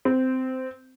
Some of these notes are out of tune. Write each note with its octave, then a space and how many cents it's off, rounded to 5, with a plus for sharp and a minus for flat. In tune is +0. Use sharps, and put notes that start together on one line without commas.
C4 -15